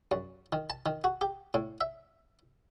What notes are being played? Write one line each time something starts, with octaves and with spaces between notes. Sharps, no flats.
F#2
D#3
A5
D#3
F#4
G4
A2
E5